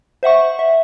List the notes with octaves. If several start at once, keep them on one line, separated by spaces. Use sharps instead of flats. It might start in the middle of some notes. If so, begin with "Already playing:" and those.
C5 E5 F#5 C#6
E5